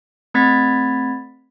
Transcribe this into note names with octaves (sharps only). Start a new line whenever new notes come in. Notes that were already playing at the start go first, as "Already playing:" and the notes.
A3 C4 B5 G#6 A6 B6